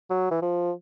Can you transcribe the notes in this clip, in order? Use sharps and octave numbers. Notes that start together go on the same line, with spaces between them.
F#3
E3
F3